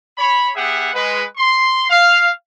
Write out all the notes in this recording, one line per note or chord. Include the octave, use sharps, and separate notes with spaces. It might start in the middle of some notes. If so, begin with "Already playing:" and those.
C#5 B5
B3 G4 G#4 E5 F#5
G#3 B4
C6
F5